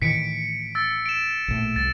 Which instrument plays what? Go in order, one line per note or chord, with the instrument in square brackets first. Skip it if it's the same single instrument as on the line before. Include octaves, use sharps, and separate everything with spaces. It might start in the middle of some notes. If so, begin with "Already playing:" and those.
[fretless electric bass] A2 D#3 E3 [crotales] B6 C#7 D7
[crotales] E6 A6
D7 E7
[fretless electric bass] A#1 A2
[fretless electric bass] C2 [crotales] A6